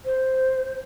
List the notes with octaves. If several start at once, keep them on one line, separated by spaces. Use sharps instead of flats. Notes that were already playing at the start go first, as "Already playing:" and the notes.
C5